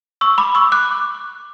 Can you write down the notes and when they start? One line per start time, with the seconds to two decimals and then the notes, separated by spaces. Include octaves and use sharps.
0.21 C#6 E6
0.38 B5 D6
0.55 C#6 E6
0.72 D6 F#6